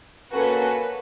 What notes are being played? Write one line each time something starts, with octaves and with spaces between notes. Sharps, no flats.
A#3 C#4 F#4 A4 B4